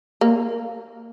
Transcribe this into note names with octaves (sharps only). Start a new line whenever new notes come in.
A#3